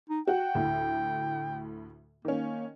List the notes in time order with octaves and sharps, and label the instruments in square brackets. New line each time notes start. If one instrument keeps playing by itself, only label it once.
[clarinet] D#4
[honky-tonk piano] F#4 F#5 [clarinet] G5
[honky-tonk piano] D2 A2
[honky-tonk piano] D#3 C#4 [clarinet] A#3